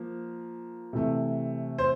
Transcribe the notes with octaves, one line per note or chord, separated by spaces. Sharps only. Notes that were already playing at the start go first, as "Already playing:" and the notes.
Already playing: F3 A#3
C3 E3 A3
C5